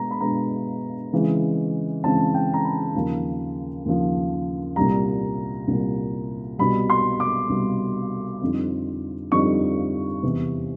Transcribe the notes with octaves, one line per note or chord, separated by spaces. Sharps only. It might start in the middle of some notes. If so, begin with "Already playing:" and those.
Already playing: B2 G#3 B3 A#5
B5
B2 G#3 B3 D4 A#5
C#3 E3 G#3 C4
C#3 E3 G#3 C4 A5
G5
A#5
B5
D#2 C#3 F3
D#2 C#3 F3
C2 A#2 G3 A#5
C2 A#2 G3
C2 B2 G3 B5
C6
D6
C2 B2 G3
F2 D3 G3 C4 D#4
F2 D3 G3 C4 D#4 C#6
E2 C3 E3